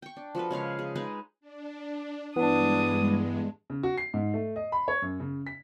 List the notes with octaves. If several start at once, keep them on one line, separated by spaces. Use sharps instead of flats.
G5 C#6
D4
F3 F#4 A4 B4
C#3 G#3 C#5 F5
G#4
G#3 D#4 G#4 B4
D4
G2 E3 G#3 B3 D4 D#6
C#3
F#4
C7
G#2
A3
D#5
B5
C#5
F#2
C#3
B6